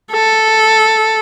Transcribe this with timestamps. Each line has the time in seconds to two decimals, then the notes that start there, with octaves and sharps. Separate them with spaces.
0.12 A4